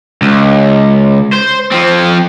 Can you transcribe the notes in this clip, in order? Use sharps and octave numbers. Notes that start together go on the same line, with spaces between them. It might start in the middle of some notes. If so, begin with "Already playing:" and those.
C#2
C5
F3 C4